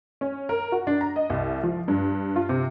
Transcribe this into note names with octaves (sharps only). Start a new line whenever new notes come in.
C#4
A#4
F#4
D4
A#5
D#5
C2
F3
G2
F4
C3